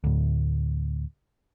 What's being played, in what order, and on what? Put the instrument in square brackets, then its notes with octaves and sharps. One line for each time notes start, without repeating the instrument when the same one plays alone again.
[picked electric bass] D2 A2